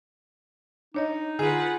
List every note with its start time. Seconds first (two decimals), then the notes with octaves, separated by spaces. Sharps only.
0.95 D4 D#4 C#5 D#5
1.39 D3 F4 G#4 B4 F#5